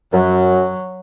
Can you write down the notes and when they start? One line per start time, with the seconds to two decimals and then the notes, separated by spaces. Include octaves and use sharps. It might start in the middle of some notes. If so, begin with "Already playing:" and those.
0.13 F#2 F#3